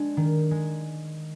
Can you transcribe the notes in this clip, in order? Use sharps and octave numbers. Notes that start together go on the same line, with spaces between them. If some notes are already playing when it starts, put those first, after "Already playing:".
Already playing: G#3 D4 D5
D#3
G#3